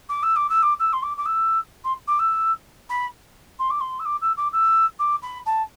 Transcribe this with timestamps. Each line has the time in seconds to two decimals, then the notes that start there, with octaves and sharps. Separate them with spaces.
0.09 D6
0.23 E6
0.36 D6
0.49 E6
0.62 D6
0.79 E6
0.93 C6
1.02 D6
1.17 D6
1.25 E6
1.84 C6
2.07 D6
2.19 E6
2.89 B5
3.59 C6
3.70 D6
3.80 C6
3.99 E6
4.05 D6
4.21 E6
4.37 D6
4.52 E6
4.99 D6
5.22 B5
5.45 A5